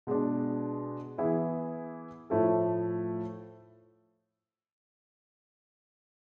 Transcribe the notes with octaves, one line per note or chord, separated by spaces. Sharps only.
B2 G#3 D4
E3 B3 E4 G#4
A2 F3 A3 E4 A4